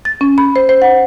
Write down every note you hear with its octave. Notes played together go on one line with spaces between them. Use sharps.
A6
C#4
B5
C5
C5
F#5